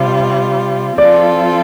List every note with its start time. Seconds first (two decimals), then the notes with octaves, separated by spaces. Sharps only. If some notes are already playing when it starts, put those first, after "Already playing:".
Already playing: C3 G3 F4
0.98 F3 C4 F4 A4 D5